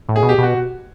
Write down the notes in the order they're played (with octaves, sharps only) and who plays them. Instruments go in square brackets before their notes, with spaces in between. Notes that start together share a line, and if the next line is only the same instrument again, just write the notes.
[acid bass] A2
[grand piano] G#4
[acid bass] B2
[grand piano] G4
[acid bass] B2 [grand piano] F#4